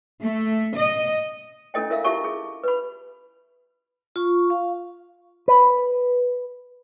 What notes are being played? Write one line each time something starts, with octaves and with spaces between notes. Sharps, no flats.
A3
D#5
C#4 D4 E4 A4 D#5 G5
E4 A#4 E5 F5
E4 F4 G4 E5 A5 C#6
G#4
B4 B5
F4 C#6
F5
B4